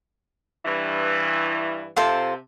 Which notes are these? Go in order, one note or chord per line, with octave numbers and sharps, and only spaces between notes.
G2 E3
C3 F4 A4 C5